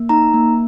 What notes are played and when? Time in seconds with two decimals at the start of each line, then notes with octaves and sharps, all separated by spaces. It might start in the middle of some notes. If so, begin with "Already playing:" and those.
Already playing: A#3
0.09 D#4 A#5
0.34 A#3